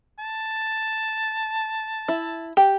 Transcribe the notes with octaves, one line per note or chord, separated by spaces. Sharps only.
A5
E4
G4